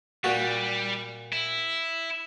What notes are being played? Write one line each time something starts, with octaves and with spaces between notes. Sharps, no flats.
A#2 G3 F#4
E4